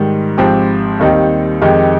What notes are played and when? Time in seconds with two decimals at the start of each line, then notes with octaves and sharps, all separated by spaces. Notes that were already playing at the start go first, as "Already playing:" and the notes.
Already playing: G#2 D#3 G3
0.38 G#1 G#2 F3 C4 G4
0.99 D#2 D#3 G3 C4 D#4
1.62 F2 D#3 G#3 D#4 G4